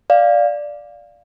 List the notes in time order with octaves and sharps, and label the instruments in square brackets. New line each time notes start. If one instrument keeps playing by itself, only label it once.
[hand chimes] D5 F5